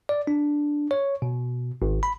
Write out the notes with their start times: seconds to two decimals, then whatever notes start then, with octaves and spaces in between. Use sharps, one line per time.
0.09 D5
0.27 D4
0.91 C#5
1.22 B2
1.82 G#1
2.03 B5